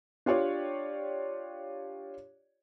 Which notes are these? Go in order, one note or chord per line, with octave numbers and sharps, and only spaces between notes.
D4 F4 G4 C#5 D5